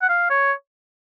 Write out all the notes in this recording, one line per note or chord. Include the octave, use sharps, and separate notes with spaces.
F#5
F5
C#5